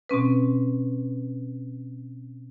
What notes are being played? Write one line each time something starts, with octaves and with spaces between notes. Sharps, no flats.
B2 C4 C#4 B4